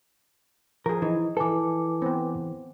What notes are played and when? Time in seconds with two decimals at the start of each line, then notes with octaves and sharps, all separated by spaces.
0.86 F3 G#4 A#4
1.02 E3 D#4
1.37 E3 A4 B4 G#5 D6
2.02 B3 C4